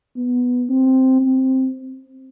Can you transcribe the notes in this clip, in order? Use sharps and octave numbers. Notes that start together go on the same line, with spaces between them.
B3
C4
C4